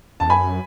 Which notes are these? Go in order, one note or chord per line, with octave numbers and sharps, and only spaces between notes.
E2 A5
F#2 G#5 B5